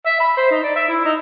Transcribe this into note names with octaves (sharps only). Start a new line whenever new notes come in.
E5
B5
C5
D#4
D5
E5
E4
D#4